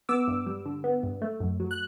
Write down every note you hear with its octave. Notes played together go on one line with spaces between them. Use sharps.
B3 D6 E6
G2
G3
D3
B3
G2
A3
F#2
F#3
F#6